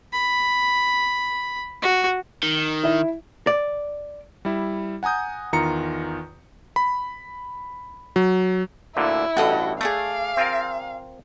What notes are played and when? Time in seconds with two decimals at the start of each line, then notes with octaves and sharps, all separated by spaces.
0.13 B5
1.82 F#4
2.43 D#3
2.84 E4 E5
3.47 D5
4.45 G3 E4
5.03 F#5 G#5 A#5 D#6 G6
5.53 E2 D#3 F4 A#5 C#7
6.76 B5
8.16 F#3
8.97 D2 A#2 D3 E4
9.37 A1 G2 F#4 A4 D#5
9.81 A3 G#4 D5 F5 D#6
10.37 C4 F4 A#4